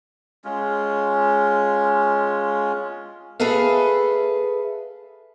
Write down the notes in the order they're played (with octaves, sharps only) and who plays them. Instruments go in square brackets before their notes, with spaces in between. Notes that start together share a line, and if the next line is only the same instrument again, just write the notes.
[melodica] G#3 C#4 F4
[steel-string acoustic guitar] G#4 A4 B4 E5 F5